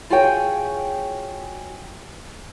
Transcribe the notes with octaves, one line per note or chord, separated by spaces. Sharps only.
F4 F#4 G#4 C#5 G5 G#5